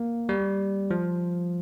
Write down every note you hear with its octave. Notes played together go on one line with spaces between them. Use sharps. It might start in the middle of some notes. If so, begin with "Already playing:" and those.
Already playing: A#3
G3
F3